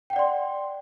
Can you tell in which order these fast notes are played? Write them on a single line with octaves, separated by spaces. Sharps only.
G5 F#5 D5 C6